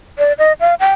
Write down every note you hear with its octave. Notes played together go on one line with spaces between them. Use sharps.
D5
D#5
F5
G5